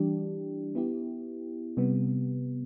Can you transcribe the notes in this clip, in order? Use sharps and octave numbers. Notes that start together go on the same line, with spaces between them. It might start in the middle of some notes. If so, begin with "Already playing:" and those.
Already playing: E3 G3 D4 G4
B3 E4 G4
C3 G3 B3